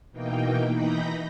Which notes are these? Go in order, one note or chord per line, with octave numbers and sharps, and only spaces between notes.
B2 E3 A#3 D#4 G5
E3 D#4 B5 G6 A#6